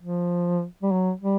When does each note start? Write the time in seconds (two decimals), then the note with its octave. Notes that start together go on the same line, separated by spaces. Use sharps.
0.02 F3
0.82 G3
0.91 F#3
1.21 G3